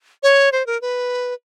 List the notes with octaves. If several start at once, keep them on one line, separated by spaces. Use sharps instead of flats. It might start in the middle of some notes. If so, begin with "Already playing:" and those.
C#5
C5
A#4
B4